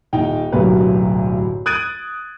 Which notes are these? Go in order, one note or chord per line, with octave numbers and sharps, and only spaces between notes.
D#1 D#4 G5
D1 B1 F#2 A#3 G4 B4
D#6 F#6 G#6 A6 D7 D#7